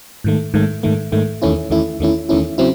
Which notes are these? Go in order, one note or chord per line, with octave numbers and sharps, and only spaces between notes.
G#2 D#3 A3
G#2 D#3 A3
G#2 D#3 A3
G#2 D#3 A3
E2 D#3 A3 C#4 E4
E2 D#3 A3 C#4 E4
E2 D#3 A3 C#4 E4
E2 D#3 A3 C#4 E4
C#3 F#3 C4 E4